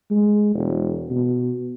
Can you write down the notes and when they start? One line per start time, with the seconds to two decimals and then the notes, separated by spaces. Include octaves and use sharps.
0.11 G#3
0.55 E1
1.10 B2